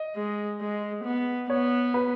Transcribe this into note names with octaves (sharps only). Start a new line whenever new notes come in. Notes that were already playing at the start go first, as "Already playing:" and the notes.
Already playing: D#5
G#3
G#3
B3
B3 C#5
B4